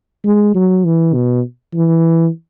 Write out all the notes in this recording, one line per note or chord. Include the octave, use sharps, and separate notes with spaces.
G#3
F#3
E3
B2
E3